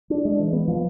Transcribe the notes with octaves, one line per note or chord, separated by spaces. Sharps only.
D4
G#3
E3
B3
F3